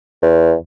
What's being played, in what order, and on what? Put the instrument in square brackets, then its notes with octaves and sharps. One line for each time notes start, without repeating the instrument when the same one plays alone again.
[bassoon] E2